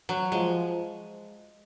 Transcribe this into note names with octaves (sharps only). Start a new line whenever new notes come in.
F#3
F3 G#3